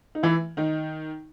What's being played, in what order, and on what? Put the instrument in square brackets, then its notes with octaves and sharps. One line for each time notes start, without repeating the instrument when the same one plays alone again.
[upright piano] D#4
E3 E4
D#3 D#4